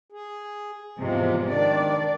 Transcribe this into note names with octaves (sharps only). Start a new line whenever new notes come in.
G#4
E2 G#2 C3 F3 G#3
D#3 D4 D5